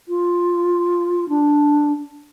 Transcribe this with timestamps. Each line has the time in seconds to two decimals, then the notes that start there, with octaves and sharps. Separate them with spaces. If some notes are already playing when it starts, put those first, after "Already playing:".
0.08 F4
1.29 D4